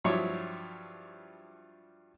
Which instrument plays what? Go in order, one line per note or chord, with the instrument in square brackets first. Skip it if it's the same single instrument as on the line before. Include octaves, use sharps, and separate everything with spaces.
[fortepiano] G2 F3 F#3 E4 C#5 D6